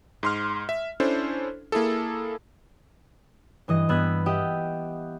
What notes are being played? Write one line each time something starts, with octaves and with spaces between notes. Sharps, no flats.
G#2 C6 F6
E5
C#4 D4 E4 A4 C5
A#3 E4 G#4 A4
G2 E3 D#5 A#6
G2 B3 E6 F#6 G#6 B6
G4 D#5 E5 F#5